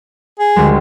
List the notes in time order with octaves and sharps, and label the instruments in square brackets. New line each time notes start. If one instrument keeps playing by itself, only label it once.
[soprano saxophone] G#4
[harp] D2 G3 G#3